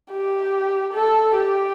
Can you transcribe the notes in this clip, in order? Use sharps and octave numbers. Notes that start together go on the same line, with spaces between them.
G4
A4
G4